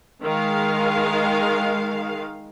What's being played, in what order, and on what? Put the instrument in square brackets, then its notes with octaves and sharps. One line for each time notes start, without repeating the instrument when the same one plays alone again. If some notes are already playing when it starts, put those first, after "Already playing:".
[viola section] D#3 G#3 F5